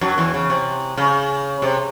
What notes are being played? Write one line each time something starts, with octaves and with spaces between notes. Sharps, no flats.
F#2 F#3
E2 E3
C#3
C3
C#3
C3